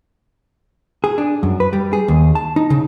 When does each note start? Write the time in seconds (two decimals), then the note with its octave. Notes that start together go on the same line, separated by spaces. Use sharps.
1.04 G#4
1.18 D4
1.43 F#2
1.60 B4
1.73 G3
1.93 G#4
2.08 D#2
2.35 A5
2.56 D#4
2.70 C#3